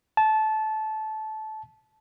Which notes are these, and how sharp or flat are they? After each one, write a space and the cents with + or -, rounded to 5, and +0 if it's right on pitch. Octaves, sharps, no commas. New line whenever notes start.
A5 -20